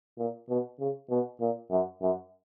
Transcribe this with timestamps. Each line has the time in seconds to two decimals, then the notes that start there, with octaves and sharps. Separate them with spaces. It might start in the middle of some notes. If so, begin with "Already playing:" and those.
0.18 A#2
0.49 B2
0.80 C#3
1.10 B2
1.41 A#2
1.71 F#2
2.02 F#2